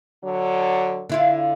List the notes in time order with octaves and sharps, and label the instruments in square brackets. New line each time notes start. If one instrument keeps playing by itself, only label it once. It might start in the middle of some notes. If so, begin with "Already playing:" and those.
[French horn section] D3 F#3
[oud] D3 E4 F4